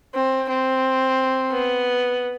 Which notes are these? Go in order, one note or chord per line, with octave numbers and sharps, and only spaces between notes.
C4
C4
B3